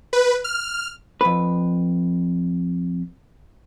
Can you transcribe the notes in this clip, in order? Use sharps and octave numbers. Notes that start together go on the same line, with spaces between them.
B4
F6
F2 B4